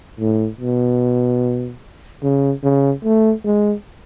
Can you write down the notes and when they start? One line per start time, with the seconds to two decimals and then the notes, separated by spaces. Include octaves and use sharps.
0.20 A2
0.61 B2
2.23 C#3
2.64 C#3
3.04 A3
3.45 G#3